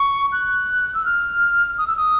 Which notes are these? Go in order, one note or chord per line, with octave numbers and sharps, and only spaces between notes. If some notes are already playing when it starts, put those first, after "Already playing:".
Already playing: C#6
F#6
E6
F6
D#6
E6
D#6